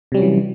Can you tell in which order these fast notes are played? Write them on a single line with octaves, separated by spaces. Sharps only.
C3 G3 C#4 F#3 E3